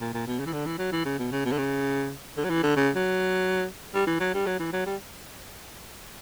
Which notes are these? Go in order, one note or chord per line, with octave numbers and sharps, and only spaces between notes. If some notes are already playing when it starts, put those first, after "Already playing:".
A#2
A#2
B2
C#3
E3
D3
E3
F#3
E3
C#3
B2
C#3
B2
D3
C#3
D3
F#3
E3
D3
C#3
F#3
G3
E3
F#3
G3
F#3
E3
F#3
G3